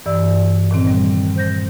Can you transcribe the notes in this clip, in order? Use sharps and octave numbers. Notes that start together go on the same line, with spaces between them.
G2 E3 D5 E6
A#2 D#3 C4
G3
C5 G6 A#6